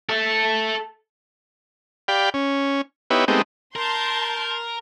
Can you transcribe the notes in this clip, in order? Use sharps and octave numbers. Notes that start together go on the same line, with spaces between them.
A4 E5
G4 D5 F5 G5 B5
C#4
B3 D#4 E4 G4 B4 C#5
G#3 A3 B3 C4 D#4 G4
A#4 A5 C6 G6